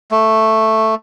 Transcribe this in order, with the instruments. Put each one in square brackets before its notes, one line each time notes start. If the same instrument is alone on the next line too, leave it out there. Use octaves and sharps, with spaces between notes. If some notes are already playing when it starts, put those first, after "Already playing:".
[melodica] A3